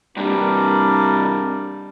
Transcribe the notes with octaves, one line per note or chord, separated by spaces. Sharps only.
G2 C3 G3 D4 A#4